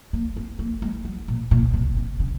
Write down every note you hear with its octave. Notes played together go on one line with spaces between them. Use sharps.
A#3
C4
A#3
G#3
F#3
A#2
A#2
C3
C3
C#3